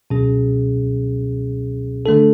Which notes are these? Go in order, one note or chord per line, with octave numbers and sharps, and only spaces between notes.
C#2 B2 F#3 C#4 G#4
D3 A3 D4 A4